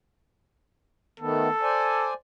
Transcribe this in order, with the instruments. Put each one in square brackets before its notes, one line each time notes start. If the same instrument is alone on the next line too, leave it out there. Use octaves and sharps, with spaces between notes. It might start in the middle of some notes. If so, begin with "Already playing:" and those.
[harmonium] D#3 A3 B3 [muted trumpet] A4
[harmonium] C5 D5 G#5